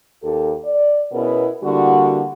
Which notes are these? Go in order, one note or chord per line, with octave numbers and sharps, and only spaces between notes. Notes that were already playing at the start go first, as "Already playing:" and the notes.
D#2 G4 A4
D5
B2 B3 C#4 E4 G#4 A#4
D3 G3 A#3 E4 F#4